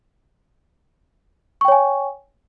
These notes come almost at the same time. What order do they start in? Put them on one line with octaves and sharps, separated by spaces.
C#6 G5 C#5 G#5